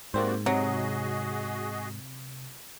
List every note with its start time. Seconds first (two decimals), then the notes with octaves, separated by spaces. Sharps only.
0.14 G#2 C3 A#3 C4 F#4 C5 D5
0.46 C3 F#3 F#4 G#4 D#5